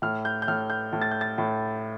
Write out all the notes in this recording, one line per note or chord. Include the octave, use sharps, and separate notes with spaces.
A2 F6
G6
G6
A2 F6
G6
A2
A6
G6
A6
A2